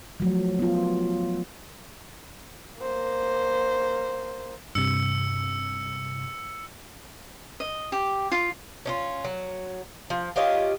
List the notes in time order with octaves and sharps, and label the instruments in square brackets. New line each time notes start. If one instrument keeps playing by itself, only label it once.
[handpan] F3 F#3 A3
B3 F4
[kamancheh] A#3 C5
[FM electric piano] G2 C3 [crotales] E6 C#7
[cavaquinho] D#5
G4
F4
[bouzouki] C#4 D#4 F4
F#3
F3
F4 G4 C#5 D#5